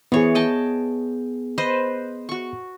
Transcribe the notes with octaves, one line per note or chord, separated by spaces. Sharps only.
E3 B3 G#4 C#5
D#5 G5 A5
B4 C5 D#5
F#4 C#6